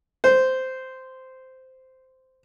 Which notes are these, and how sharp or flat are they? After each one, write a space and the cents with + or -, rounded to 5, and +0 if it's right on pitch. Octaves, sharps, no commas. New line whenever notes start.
C5 -10